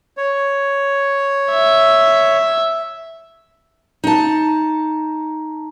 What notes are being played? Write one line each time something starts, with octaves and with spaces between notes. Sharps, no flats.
C#5
E5
D#4 A5